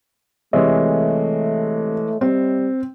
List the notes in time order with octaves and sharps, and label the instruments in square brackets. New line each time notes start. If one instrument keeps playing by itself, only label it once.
[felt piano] C3 [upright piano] E3 G#3 [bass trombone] A3 [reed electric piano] C#5 D#5 E5
[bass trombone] G3 [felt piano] C4